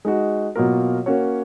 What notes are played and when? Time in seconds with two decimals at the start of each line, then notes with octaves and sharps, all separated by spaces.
0.05 G#3 D#4 F#4
0.55 B2 F#3 A#3 F4 A#4
1.06 A#3 C#4 F#4 C#5